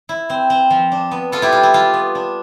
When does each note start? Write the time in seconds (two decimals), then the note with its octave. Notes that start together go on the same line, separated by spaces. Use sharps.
0.09 E4
0.30 C4
0.50 C4
0.70 F3
0.92 D4
1.11 B3
1.32 B3 F4 A4
1.42 E4 G4
1.52 G3 F4
1.63 E4
1.73 D4 F4
1.94 B3
2.15 D4